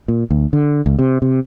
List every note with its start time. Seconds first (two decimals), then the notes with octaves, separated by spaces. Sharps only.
0.08 A#2
0.30 D2
0.53 D3
0.86 C#2
0.99 C3
1.22 C3